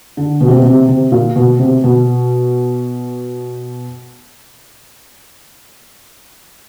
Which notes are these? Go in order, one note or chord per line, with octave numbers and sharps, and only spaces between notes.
D3
B2
C3
B2
C3
C3
A#2
B2
C3
B2